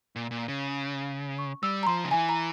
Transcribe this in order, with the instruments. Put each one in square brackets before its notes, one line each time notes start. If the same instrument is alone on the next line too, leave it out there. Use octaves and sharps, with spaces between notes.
[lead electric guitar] A#2
A#2
C#3
[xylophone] C#6
[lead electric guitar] G3 [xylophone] E6
[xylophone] A#5
[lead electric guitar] F3 [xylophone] C6
[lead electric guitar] C#3
[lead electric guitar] E3 [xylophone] G#5
[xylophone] A#5